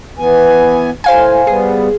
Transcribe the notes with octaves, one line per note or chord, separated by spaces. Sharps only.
E3 B3 G#5
A2 C5 F5 G#5
G3 B3 G#4